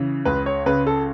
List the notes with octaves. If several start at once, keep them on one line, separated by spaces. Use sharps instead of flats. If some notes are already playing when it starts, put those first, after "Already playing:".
Already playing: C#3 E3
C#2 B4
C#5
C#3 B4
A4